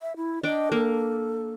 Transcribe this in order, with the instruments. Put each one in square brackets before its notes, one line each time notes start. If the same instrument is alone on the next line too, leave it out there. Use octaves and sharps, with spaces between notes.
[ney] E5
E4
[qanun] D4 G5 [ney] D#5
[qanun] A#3 [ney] A4